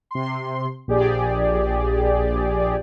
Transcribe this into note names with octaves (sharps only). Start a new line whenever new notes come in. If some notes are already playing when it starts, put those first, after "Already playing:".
C3 C6
A#1 G4 G#4 D5